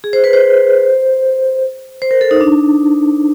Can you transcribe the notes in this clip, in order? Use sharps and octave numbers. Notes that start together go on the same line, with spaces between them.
G#4
C5
B4
C5
C5
A#4
A4
D#4
D4